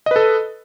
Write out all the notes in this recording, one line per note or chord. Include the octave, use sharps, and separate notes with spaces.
A4 B4 D#5